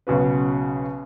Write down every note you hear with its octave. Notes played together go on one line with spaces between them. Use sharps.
B1 C#3 F#4 B4